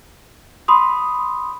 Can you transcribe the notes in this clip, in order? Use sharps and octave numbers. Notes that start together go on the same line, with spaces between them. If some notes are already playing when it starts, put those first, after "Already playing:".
B5 C6 D#6